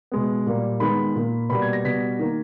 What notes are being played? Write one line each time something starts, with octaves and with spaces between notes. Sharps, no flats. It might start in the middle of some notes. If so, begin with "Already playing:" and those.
B2 G#3 B3
A#2 G3 A#3
D#3 G#3 B3 B5
A#2 A#3
B2 G3 A#3 B5
G#6
A#6
B2 G3 B3 B6
D#3 A#3